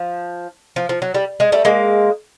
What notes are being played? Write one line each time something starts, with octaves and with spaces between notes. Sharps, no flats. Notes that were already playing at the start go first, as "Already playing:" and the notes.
Already playing: F3
F3
F3
F#3
G3
G#3
G3 A3
G#3 A#3